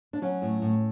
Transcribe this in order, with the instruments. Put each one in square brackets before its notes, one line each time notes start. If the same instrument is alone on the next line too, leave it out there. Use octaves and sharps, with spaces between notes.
[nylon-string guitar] D4
F#3 C#4
A2
A2